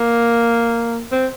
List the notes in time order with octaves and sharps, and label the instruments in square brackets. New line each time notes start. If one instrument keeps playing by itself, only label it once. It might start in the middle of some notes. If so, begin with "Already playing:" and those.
Already playing: [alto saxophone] A#3
C4